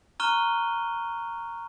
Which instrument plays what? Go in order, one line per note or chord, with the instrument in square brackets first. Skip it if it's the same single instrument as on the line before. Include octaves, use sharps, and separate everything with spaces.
[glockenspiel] A#5 C#6 F6 F#6 D#7 G7